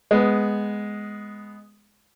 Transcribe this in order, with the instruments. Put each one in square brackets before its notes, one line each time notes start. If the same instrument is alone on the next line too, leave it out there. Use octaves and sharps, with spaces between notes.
[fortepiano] G#3 B3